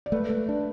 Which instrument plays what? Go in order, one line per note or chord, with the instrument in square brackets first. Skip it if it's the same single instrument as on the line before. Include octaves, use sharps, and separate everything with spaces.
[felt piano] D5
[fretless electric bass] A3 [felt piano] B4
[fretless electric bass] A3
D4